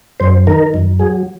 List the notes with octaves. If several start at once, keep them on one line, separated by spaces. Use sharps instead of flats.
F#2 C5
D#3 A#4
F#2
F#3 G#4